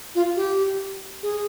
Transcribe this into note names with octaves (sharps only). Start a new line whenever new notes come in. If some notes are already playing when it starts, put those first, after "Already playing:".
F4
G4
G#4